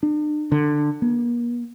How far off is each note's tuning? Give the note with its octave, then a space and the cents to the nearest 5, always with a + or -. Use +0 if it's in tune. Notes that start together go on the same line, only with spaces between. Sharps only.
D4 +45
D3 +15
A#3 +45